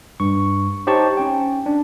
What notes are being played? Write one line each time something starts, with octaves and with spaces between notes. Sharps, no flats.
G2 C#6
D#4 G4 C5 C#5 A5 C#6
C#4 G5
D4